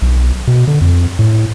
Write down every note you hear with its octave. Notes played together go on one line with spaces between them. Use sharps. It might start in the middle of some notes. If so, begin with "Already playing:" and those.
B1
B2
D3
F2
A2